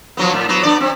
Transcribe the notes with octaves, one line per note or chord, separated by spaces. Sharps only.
F3 F#3 B3
A2
F#3 B3
B3 D4 D5
C4